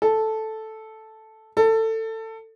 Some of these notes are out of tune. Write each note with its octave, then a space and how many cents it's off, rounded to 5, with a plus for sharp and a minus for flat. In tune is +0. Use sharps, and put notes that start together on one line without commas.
A4 -5
A4 +20